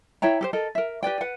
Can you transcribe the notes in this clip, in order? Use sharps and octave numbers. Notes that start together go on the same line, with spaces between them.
E4 C#5 G5 A#5
G4 A4 C5
A4 A#4 D#5
A#4 E5
G4 B4 D5 G5
B4 F#5